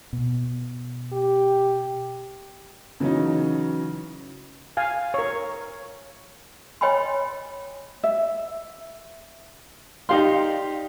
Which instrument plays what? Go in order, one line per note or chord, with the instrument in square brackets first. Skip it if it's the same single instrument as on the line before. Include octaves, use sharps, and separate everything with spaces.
[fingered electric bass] B2
[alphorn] G4
[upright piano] C#3 E3 F#3 C#4 D#4
[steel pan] F5 G#5
A#4 C#5
[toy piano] C#5 D#5 G5 G#5 B5 C6
[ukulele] E5
[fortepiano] D#4 G4 C6 [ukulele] D5 F5